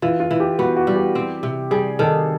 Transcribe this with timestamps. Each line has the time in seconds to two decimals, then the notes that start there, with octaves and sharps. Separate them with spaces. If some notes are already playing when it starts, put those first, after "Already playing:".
0.02 E3 F4
0.20 F4
0.31 E3
0.40 G4
0.59 B3 F#4
0.77 F#4
0.87 G3
0.95 G4
1.15 C4
1.43 C3
1.71 G3 G#4
1.99 D#3 A4